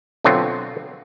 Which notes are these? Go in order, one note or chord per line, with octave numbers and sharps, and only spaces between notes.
B2 D3 F#3 C4 F4